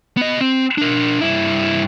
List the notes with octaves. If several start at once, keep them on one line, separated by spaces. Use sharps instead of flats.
B3 D#5
C4
D4 A#4
G2 E4